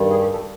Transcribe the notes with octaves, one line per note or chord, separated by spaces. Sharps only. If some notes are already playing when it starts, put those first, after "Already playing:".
Already playing: G2 D#3 G3
G#4
G4
A4